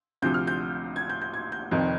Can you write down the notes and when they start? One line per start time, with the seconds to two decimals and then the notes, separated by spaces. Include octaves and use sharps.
0.22 D2 C3 F3 G6
0.34 F6
0.47 G6
0.96 G#6
1.10 G6
1.22 G6
1.34 G#6
1.52 G6
1.71 F1 F2 D#3